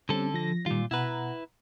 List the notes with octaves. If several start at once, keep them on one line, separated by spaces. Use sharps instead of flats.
D3 G3 C4 C#4 A4
F3 A#6
A#2 D#3 G3 F4
B2 E4 B4 F#5 A#5